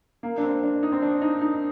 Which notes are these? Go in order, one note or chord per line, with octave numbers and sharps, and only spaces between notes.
A#3
D4
C4
D4
D#4
C4
D4
D#4
D#4